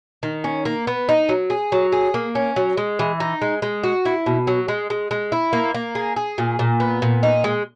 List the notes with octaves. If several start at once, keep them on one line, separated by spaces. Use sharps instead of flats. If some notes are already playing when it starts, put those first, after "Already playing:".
D#3
C#4
A#3
B3
D#4
F#3
G#4
F#3
G#4
A#3
C#4
F#3
G#3
E3
D#4
G#3
G#3
F#4
E4
B2
F#3
G#3
G#3
G#3
E4
A#3
A#3
G#4
G#4
A#2
A#2
B3
A#2
D#4
G#3